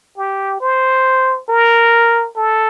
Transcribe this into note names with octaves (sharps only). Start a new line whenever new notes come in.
G4
C5
A#4
A4